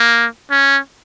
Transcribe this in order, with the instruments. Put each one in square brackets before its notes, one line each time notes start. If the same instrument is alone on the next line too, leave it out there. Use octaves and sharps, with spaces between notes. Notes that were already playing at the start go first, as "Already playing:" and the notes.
Already playing: [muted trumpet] A#3
C#4